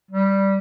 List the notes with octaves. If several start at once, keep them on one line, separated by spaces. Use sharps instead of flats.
G3